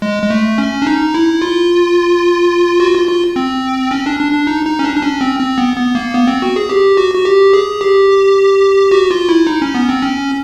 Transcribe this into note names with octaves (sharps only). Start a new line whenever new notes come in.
G#3
G#3
A3
C#4
D4
D#4
E4
F4
F#4
F4
F4
C4
C#4
D4
D4
D4
D#4
D#4
C#4
D4
D4
C#4
C4
C4
B3
B3
A#3
B3
C4
F#4
G#4
G4
F#4
F#4
G4
G#4
G4
F#4
F4
E4
D#4
C#4
B3
C4
C#4